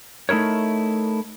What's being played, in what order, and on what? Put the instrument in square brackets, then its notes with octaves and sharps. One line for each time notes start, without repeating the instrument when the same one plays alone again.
[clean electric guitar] A3 D#4 E4 A#4 C#5